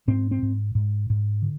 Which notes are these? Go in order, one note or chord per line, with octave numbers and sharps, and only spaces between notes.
G#2 C4
C4
G#2
G#2
G#2
D3